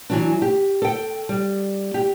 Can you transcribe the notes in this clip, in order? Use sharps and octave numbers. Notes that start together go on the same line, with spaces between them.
E3 F#3 D4
G4
A4 G5
G3
G4